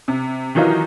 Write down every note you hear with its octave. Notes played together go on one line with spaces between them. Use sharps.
C3
D#3 E3 F#3 D#4 F4